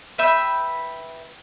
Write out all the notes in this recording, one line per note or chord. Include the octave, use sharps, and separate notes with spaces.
B4 E5 G5